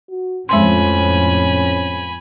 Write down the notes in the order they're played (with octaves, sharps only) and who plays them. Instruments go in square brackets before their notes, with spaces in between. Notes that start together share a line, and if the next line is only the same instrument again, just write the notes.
[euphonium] F#4
[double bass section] F2 A2 [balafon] G#3 C6 [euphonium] C#4 [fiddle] G#5 B5